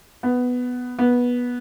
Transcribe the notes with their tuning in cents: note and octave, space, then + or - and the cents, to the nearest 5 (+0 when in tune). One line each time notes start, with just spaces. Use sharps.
B3 +5
B3 -15